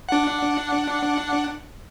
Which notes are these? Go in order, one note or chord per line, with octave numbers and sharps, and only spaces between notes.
D4 F#5